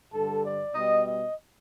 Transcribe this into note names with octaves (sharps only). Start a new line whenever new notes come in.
G2 D3 G3 A4
D5
B2 G3 D#5
D#5